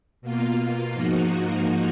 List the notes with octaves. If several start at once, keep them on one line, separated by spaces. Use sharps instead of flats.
B2 A#3 F4
G#2 F3 A#3 D#4 F#4